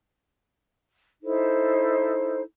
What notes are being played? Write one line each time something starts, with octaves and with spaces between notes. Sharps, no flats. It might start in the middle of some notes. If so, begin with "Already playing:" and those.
D#4 E4 A4 C5